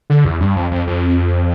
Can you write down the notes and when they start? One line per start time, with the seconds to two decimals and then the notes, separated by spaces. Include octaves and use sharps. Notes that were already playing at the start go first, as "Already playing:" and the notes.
0.10 D3
0.25 E2
0.40 G2
0.56 F2
0.71 F2
0.87 F2